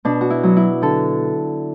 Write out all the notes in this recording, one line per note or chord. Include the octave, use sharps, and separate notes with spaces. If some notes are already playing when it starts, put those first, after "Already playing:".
B2 D4
F#4
E4
F#3 B3
E4
D3 A4